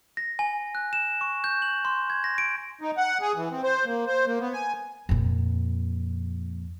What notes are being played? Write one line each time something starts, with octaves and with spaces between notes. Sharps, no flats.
A#6
G#5
F#6
E7
C#6
G6
F#7
C6
G#6
A#6
D7
D#4
F#5
G#4
E3
C4
C5
A#3
C5
A#3
B3
G#5
F2 A#2